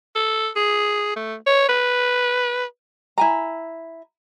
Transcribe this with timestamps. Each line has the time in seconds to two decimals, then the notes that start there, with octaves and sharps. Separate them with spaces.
0.15 A4
0.56 G#4
1.16 A3
1.46 C#5
1.68 B4
3.18 E4 G#5 A#5